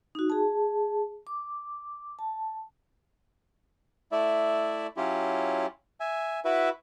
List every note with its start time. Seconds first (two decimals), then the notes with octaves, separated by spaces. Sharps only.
0.15 D#4 F#4
0.30 G#4 A5
1.27 D6
2.19 A5
4.12 A3 E4 D5 E5
4.97 F#3 C#4 E4 F4 G4
6.00 E5 G#5
6.45 E4 F#4 B4 E5